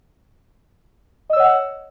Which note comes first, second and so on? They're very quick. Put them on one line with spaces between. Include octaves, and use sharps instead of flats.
D#5 E6 C#5 F#5